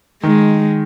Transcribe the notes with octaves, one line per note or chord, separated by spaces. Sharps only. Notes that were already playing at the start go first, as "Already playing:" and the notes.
D#3 G#3